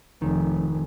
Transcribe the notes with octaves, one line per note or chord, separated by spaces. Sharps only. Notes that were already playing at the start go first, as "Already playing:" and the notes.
F1 D#3